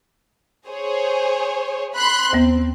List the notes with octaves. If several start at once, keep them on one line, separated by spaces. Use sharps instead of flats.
G#4 C5 C#5
B5 C6 F#6
D#2 B3 C4